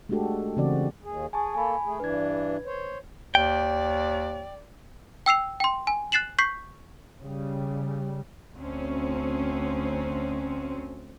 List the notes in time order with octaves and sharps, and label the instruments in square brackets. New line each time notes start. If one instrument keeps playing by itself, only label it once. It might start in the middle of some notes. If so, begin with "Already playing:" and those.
[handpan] G#3 A3 D4 F#4 G4 A4
C#3 E3 C4 F#4 D5
[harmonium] D#2 G#4
[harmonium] G#4 [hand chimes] G#5 A5 C#6
[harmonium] A#3 A4 [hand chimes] G#5 B5
[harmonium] A3 G#4
[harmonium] G2 E3 D4 [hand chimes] B4 G#6
[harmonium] C5 C#5
[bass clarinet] D#2 [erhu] D5 [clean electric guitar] G5
[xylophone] G5 E6 C7 F7
G5 C6
G#5
F#6 A6 C7 E7 F#7
C#6 G6 B6 C7
[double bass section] C#3 G3
[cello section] D2 C4 C#4